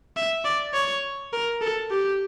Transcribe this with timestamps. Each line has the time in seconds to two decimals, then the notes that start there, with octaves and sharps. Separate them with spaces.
0.17 E5
0.45 D5
0.74 C#5
1.33 A#4
1.61 A4
1.91 G4